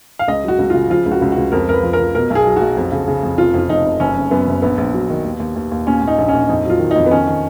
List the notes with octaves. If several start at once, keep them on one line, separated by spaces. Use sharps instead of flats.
F5
C#2 D#5
F#3 F#4
C#2
C#3 F4
F3 F4
C#2
F#4
C#2
F#4
C#2
F2 A#4
F2 A#4
B4
F3
A#4
F3
B2 A#4
B1
G#4
F#3
B1 F#4
F2
C#3
C#3
F2
F1 F4
F2 F4
F1 D#4
F1
F#1 C#4
F#1
F#2 B3
F#1
A#1 B3
A#1
F#3
D#3
D#2
D#2
D#2
D#2
A#2 C#4
A#2
D#4
A#1
A#1 C#4
F2 D#4
F#3 F4
D#3
F2 D#4
B3
D#3 C#4
D#3